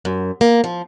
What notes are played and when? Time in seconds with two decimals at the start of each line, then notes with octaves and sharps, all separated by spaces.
0.05 F#2
0.41 A#3
0.64 F3